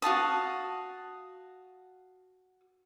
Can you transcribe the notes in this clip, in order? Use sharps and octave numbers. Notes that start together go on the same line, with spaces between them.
F#4 F5 A5 D#6